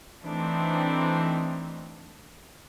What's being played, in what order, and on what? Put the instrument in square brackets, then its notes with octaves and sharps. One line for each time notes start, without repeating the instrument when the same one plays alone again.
[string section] E3 A3 C4 D4 D#4